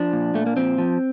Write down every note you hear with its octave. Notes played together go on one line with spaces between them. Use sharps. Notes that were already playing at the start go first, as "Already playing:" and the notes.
Already playing: F3 D4
A#2
A#2 A3
A#3
F3 C4
F3